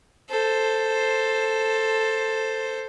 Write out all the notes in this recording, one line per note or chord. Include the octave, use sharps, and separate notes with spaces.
A4 C5